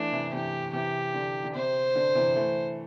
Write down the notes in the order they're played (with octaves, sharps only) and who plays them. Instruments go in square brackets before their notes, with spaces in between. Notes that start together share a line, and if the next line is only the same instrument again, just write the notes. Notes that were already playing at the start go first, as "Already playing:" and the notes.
Already playing: [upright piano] E3 A3 [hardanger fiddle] D4
[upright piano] C3 E3
[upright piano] C3 E3 [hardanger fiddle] G4
[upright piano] C3 E3 [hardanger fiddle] G4
[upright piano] D3
D3
[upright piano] C3 [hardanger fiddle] C5
[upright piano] D3
C3 E3
E3 A3